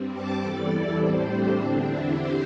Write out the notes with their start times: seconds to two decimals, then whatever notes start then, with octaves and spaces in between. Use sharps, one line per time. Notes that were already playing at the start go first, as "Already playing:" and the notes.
Already playing: G2 G3 C4
0.13 A5 D6
0.41 E2 E3 G3 A4 D5
0.69 E4 A4
0.97 A2 G3 C4 G4 C5
1.26 D4 G4
1.54 E2 D3 C4 D4
1.82 E4
2.10 E2 D3 C4 G4 C5